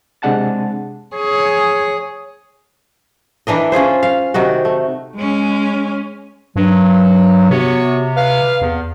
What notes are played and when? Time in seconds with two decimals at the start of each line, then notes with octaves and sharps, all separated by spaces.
0.22 C3 G#3 D4 F#5 A5 A6
1.15 G#4 C#5
3.47 E3 D4 A#4 D#5
3.72 C#4 F4 G#4 C5
4.03 F5
4.34 C3 D#3 D#4 F#4
4.65 A3
5.16 G#3 C#4
6.56 G2 F#3
7.50 C3 B3 F#4 C#5
8.16 B4 F5
8.62 E2